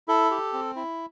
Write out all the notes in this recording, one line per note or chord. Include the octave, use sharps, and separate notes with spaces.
E4 A4
G4
C4
E4